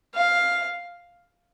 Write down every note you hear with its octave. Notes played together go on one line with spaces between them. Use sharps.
F5